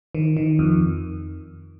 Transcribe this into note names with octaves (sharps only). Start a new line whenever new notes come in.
D#3
D#3
F2